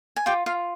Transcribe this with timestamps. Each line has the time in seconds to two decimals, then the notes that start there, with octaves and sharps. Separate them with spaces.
0.16 G#5
0.26 F4 G4 G5
0.46 F4 F5